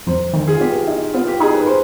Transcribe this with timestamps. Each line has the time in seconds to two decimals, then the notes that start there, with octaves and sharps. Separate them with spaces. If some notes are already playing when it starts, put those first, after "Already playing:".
0.07 F2 C5
0.33 D#3
0.48 G#4
0.55 F4
0.60 B3 G4
0.88 D#4
1.14 B3 F4
1.27 G4
1.40 D#4 G#4
1.54 B4
1.67 C5